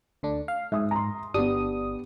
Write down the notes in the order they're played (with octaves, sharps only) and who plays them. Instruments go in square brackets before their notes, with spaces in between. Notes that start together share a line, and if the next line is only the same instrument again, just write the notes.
[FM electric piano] D2 D3 D4
F5
[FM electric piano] G#2 [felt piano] E5 D#6
[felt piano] A#5 C6
[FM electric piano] G1 D4 D#6 [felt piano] B3 G4